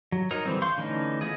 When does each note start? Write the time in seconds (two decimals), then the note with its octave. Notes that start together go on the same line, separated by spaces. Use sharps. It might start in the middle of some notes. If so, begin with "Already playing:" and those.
0.12 F#3
0.31 F#3 D#4 A#4 C#5 A#5
0.46 D3 E3 G3 C4
0.62 F5 C6 C#6 G6
0.77 D3 E3 A3 C#4 D#4
1.21 B3 E4 F4 G#4 D#5